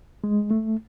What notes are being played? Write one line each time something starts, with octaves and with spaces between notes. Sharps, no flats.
G#3
A3